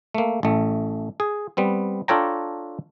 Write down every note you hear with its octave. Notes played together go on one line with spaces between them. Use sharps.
A3 A#3
A1 A3
G#4
G3 B3 C4
D4 F4 A4 C#5 G5 A#5